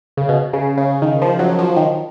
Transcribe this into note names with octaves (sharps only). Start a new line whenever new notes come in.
C#3
B2
C#3
C#3
D#3
F3
F#3
F3
D#3